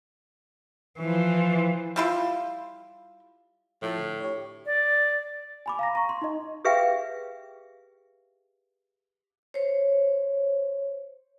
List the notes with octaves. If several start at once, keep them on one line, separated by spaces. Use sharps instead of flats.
E3 F3
G3 E4 F4
A2 F3 E4 A5
D3
G4 C#5
D5
G#5 B5 D6
F5 A#5 A#6
A#5 C#6
C6
D#4 D#5
G4 G#4 B4 E5 F5 G5
C5 C#5